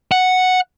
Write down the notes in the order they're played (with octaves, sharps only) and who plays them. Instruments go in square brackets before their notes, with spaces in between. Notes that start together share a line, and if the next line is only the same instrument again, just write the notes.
[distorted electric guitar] F#5